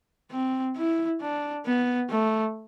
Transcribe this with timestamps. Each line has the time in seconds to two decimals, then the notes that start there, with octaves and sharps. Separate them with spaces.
0.31 C4
0.76 E4
1.22 D4
1.66 B3
2.10 A3